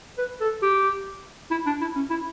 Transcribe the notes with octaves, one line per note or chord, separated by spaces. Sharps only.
B4
A4
G4
E4
D4
E4
C#4
E4